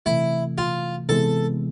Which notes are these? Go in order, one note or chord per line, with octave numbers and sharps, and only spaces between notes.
C3 E3 A3 E4
F4
C3 E3 G#3 B3 A4